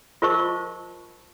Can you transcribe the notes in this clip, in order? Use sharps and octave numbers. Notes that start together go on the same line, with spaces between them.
F4 A#4 C5 D#5 A5 C#6